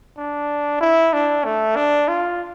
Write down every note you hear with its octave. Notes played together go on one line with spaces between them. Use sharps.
D4
E4
D4
A3
D4
F4